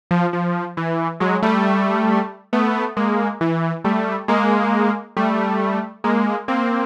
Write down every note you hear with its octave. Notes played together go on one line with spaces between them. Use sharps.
F3
F3
E3
F#3 G#3
G3 A3
A3 B3
G#3 A#3
E3
G3 A3
G#3 A#3
G3 A3
G#3 A#3
A#3 C4